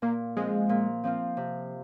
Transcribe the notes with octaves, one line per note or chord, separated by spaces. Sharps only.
A#2 A#3
F3 G#3 C4 F4
A#2
F3 C4 F4
C3